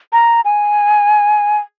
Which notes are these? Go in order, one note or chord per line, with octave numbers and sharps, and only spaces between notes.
A#5
G#5